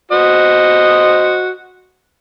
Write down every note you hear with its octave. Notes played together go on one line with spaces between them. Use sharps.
F#4 C5 D#5